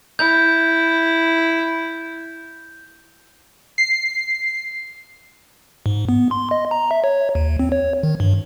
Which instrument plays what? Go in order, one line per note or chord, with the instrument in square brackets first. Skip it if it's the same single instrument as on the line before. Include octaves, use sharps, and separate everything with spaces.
[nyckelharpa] E4 [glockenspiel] G6
[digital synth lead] C7
[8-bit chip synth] G#2
B3
C6
D#5
A#5
E5
C#5
D#2
C4
C#5
D#3
G2